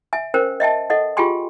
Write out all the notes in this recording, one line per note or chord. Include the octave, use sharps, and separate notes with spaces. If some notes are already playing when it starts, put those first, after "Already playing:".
E5 G#5
C#4 A#4 C5 G5
D#5 E5 G5 A5
A4 D#5 F#5
F4 G4 G#4 G5 G#5 C6